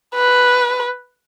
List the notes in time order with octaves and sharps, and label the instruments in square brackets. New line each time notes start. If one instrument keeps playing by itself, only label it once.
[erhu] B4